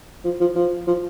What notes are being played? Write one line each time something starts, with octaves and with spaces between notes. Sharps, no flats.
F3
F3
F3
F3